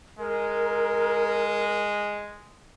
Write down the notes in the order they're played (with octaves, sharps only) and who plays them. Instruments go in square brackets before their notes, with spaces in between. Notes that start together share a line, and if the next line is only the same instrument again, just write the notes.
[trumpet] G#3 [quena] A#4